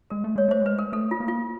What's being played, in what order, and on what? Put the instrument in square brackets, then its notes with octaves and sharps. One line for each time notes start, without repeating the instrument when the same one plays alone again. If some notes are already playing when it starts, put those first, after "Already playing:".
[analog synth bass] G#3 [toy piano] A#4
[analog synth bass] A3
[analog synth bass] G#3 [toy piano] C#5
[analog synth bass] A3 [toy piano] C5
[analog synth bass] G#3 [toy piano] B4
[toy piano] A#4
[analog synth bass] A3 [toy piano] A4
[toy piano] F4
[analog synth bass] A#3
[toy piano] F4